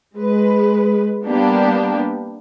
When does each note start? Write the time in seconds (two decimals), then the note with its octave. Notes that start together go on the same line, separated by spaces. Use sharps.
0.18 G#3 B4
1.26 G3 A#3 B3 D4 G4